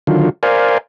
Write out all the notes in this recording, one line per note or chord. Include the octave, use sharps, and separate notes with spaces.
D3 D#3 F#3 F4
A#4 C5 D5 F5 G#5